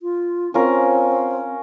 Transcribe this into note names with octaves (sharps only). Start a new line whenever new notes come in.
F4
C4 C#4 F4 A#4